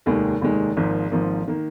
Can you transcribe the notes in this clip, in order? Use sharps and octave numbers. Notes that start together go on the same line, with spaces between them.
F1 D#2 D#3 G#3
F1 D#2 D#3 G#3
G#1 G#2 F3 A#3
G#1 G#2 F3 A#3
D#3 A#3